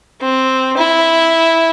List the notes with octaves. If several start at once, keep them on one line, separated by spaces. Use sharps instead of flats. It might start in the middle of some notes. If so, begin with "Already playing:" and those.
C4
E4